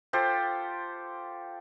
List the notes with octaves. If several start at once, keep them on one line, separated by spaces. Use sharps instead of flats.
F4 G4 A4 C5